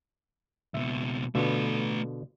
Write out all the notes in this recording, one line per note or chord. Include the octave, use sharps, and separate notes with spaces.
C#2 B2 E5
B2 D3 A3 F4 B4